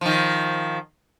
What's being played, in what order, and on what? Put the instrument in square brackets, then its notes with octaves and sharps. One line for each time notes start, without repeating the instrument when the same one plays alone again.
[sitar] D#3 F3